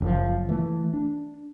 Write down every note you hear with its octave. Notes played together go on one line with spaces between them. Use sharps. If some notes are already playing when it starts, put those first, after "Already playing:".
F#1 F#2 B2 F3
E3 A3
D4